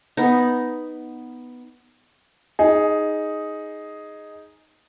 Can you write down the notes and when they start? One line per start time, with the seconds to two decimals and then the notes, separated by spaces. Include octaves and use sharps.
0.17 B3 D#4
2.59 D#4 G#4